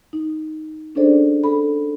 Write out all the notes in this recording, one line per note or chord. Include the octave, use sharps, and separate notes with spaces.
D#4
C#4 D4 G#4 A4 C5 D5
A4 B5